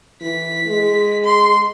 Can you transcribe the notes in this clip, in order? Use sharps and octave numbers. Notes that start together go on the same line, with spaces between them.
E3 B6
G#3
C6